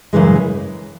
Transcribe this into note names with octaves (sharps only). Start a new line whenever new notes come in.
F#2 C#3 E3 G#3